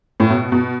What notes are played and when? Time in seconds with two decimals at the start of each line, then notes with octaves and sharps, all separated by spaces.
0.20 A2
0.30 B2
0.52 B2